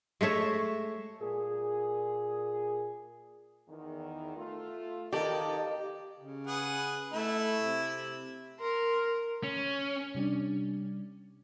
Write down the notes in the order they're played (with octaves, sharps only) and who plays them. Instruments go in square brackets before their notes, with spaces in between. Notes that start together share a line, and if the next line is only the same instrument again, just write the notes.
[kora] G#3 A3 C#5 E5
[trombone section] A#2 G#4
[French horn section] E2 D#3
A3 F4
[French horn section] D#3 [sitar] A#3 A4 D5 [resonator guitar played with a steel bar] G4 [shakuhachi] D#5
[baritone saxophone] C#3
[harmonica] G#4 B4 F#5
[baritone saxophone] A3 [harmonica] E4
[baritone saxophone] C3
[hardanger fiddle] A#4 C6
[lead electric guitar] C#4
[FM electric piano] C3 G3 C#4 D4